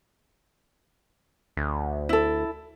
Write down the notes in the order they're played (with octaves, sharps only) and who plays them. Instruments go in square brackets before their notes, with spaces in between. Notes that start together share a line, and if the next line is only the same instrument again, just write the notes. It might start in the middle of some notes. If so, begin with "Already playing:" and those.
[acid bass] D2
[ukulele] E4 A4